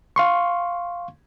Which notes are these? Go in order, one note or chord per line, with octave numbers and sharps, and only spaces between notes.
F5 C6 C#6